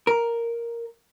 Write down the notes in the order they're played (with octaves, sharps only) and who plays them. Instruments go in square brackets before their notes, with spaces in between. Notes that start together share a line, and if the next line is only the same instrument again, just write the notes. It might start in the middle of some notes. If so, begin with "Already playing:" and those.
[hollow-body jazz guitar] A#4